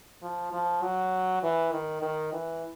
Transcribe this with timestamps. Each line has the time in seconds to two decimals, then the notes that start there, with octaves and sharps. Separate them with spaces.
0.23 F3
0.53 F3
0.82 F#3
1.43 E3
1.72 D#3
2.02 D#3
2.33 E3